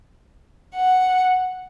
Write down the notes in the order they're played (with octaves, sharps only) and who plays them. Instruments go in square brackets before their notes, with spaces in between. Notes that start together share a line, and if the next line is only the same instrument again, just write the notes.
[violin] F#5